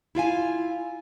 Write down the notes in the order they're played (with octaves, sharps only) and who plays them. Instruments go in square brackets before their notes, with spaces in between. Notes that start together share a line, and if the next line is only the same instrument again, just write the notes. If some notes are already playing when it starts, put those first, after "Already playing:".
[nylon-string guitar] E4 F4 F5 G#5